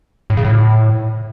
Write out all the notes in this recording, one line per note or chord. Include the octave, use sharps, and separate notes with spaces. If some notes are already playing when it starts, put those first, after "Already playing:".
A2
C#3
A2